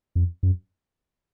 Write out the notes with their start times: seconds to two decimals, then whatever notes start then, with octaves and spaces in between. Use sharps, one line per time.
0.15 F2
0.43 F#2